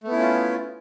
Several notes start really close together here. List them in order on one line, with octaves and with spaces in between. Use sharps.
A3 B3 E4 C#4 F4